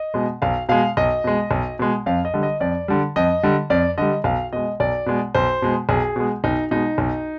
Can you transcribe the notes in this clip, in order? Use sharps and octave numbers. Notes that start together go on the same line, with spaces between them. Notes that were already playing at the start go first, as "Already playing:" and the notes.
Already playing: D#5
B2 G#3
B1 F5
B2 G#3 F5
B1 D#5
B2 G#3
B1
B2 G#3
F2 F5
D#5
D3 G3
D#5
F2 D5
D3 G3
F2 D#5
D3 G3
F2 D5
D3 G3 D#5
B1 F5
B2 G#3 D#5
B1 D5
B2 G#3
B1 C5
B2 G#3
B1 G#4
B2 G#3
B1 D#4
B2 G#3 D#4
B1